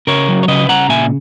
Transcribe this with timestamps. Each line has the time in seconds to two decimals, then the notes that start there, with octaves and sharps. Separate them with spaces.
0.07 C#3 A#4 C#5
0.28 F#3
0.43 C#5
0.48 C#3 B4 D#5
0.68 C#3 F#5 A#5
0.89 A#2 E5 G#5